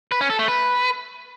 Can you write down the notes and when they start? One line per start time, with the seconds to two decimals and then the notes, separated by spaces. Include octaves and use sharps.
0.12 B4
0.21 C#4
0.30 A4
0.39 A3
0.48 B4